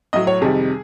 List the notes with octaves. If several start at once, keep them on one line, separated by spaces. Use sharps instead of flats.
A2 F#3 D#5
C#5
F2 C3 D#3 G3 G#4